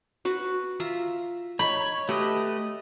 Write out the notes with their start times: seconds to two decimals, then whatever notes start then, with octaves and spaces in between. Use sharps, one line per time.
0.25 F#4 B4
0.80 F4 E5 A#5
1.59 C#5 B5
2.09 A3 G4 B4 D#5